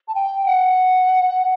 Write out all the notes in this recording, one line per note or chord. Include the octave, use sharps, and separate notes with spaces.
A5
G5
F#5